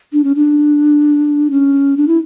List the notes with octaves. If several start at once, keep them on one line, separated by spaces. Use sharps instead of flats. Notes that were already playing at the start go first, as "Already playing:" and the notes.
D4
C#4
D4
C#4
D4
E4